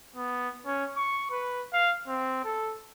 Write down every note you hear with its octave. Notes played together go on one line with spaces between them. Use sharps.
B3
C#4
C#6
B4
F5
C4
A4